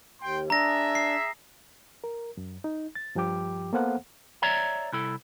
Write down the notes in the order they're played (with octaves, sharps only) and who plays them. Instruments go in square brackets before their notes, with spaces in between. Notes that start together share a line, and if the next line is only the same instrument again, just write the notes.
[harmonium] D#2 [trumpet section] G5 C6
[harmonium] D4 [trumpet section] G#4 E5 [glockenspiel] A#5 A#6
[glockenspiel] C7
[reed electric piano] A#4
F#2
D#4
A6
G2 F3 G4 G5 D6
A#3 B3 A4 C5 F5 F#5
[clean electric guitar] C#5 D5 E5 A#5
C2 E4 A4